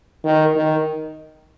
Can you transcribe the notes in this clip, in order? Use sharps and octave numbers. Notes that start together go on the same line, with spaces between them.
D#3
D#3